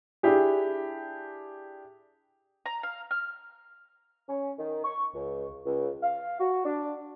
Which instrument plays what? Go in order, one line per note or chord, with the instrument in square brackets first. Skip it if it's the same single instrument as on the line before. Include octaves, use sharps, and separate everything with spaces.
[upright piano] D4 E4 G4 G#4
[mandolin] A#5
F5
F6
[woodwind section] C#4
D#3
C#6
C#2
C#2
F5
F#4
D4